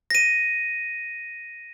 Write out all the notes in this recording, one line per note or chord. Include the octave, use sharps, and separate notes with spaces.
A#6 D#7